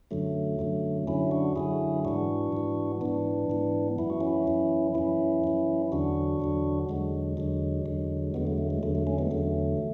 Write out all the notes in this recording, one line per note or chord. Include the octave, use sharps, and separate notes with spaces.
F#2 D3 F#3 A3
F#2 D3 F#3
F#2 D3 F#3 C#4 E4
D4 F#4
F#2 D3 F#3 E4 G#4
G#2 E3 D4 F#4
G#2 E3
G#2 E3 B3 D4
G#2 E3
F#2 E3 E4
F#4
C#4 E4
F#2 E3
F#2 E3 C#4 E4
F#2 E3
E2 D3 F#3 D4 F#4
E2 D3 F#3
E2 D3 F#3 G#3
E2 D3 F#3
E2 D3 F#3
E2 D3 F#3 G#3 B3
A3
A3
G#3
E2 D3 F#3 A3
A3
A3 C#4
G#3 B3
E2 D3 F#3 A3